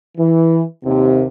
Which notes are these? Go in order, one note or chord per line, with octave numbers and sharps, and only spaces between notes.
E3
D#2 C3